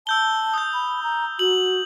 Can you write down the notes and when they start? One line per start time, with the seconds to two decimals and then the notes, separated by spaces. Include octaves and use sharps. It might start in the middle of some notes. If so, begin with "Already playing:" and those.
0.07 A5 E6 G6 G7
0.54 D#6 G6
0.74 B5
1.03 A#5
1.39 F#4 F#7